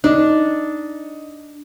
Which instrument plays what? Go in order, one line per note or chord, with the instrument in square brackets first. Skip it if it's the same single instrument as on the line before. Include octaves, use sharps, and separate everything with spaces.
[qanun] D4 [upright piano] D#4